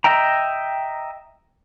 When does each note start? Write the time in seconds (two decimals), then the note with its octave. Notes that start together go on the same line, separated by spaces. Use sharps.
0.04 D#5 E5 G5 A#5